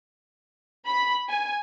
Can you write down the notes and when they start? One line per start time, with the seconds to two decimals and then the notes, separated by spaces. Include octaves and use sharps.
0.87 B5
1.29 G#5